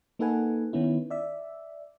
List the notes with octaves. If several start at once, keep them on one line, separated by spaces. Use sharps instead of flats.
A#3 D#4 A4 B4 F#5 G#5
D#3 B3 C#4 E4
D5 E5